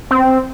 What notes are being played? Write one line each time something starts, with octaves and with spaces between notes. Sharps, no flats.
C4